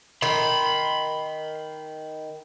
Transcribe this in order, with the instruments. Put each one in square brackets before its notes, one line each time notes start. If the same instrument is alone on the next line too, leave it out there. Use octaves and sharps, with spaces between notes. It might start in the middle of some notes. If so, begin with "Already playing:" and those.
[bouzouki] D#3 [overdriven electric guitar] B5 C6